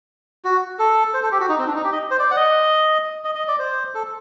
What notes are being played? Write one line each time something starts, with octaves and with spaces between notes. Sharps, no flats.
F#4
A4
C5
A4
G4
F#4
D#4
C4
D4
D#4
G4
D#5
C5
D5
F#5
D#5
D#5
D#5
D5
C5
A4